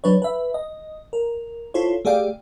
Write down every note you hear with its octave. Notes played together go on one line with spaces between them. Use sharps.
F#3 D4 B4 C#5
B4 E5
D#5
A#4
E4 F4 A4 C5 C#5
A3 G4 G#4 D5 F5 G5